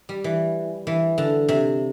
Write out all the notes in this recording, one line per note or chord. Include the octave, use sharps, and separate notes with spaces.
G3
E3
E3
D3
C3